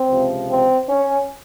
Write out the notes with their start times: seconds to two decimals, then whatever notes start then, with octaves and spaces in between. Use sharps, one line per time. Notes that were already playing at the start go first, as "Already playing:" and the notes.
Already playing: C4
0.10 C#2 C3 F3
0.49 C4
0.89 C#4